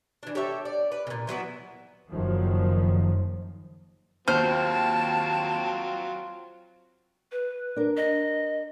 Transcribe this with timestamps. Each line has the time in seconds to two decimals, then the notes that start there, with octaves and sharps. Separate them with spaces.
0.23 E3 D4
0.35 G4 A4 C#5 E5
0.65 D5
0.92 B4
1.07 A#2 C#3
1.27 E3 F#3 B3 E4
2.11 F#1 F#2 D#3 F3
4.28 D#2 F#3 C4 F4 C5 A5 F6 D#7
7.32 B4
7.76 D4 A#4
7.97 D#5